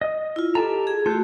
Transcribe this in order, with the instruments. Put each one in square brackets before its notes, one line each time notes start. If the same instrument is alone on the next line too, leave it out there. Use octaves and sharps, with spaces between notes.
[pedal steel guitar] D#5
[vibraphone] E4 F4
[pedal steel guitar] G4 A5 A#5 [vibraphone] A4
[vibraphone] G#4
[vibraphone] A3 F#4 [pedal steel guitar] F4 A4 G6